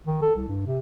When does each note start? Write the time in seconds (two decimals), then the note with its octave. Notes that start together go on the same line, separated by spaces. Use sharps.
0.07 D#3
0.22 A4
0.36 C2
0.47 G2
0.66 C3